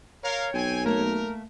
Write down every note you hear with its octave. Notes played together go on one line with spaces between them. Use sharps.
A#4 C#5 F5
B1 C4 G5 G#5
A3 A#3 A#4